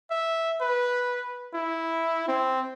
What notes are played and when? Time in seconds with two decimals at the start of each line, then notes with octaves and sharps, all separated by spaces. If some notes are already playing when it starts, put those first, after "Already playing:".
0.11 E5
0.61 B4
1.54 E4
2.28 C4